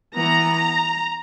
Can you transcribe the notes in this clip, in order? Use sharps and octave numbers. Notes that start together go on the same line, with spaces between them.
E3 B3 A#5